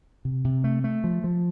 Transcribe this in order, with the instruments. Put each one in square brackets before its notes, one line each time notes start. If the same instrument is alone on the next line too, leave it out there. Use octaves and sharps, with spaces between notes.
[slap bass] C3
C3
A3
A3
F3
F3